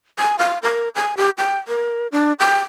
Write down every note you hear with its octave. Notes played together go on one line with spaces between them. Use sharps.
G#5
F5
A#4
G#5
G4
G5
A#4
D4
G5